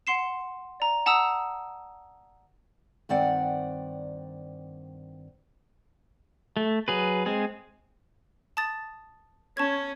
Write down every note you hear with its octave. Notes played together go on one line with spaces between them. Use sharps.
F#5 C6 C7 E7
D5 A#5
F#5 A5 A#5 D#6 E6
G2 D#3 C4 D5 F#5
A3
F#3 G#4 B4
G#3 C4 G#4
A5 D#6 A6
C#4 A5 C#6 G#6